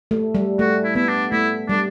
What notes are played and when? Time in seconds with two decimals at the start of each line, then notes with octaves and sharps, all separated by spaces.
0.11 A3
0.35 G3
0.59 A3 F#4
0.84 E4
0.95 B3 E4
1.09 D4
1.32 A3 E4
1.69 G3 D4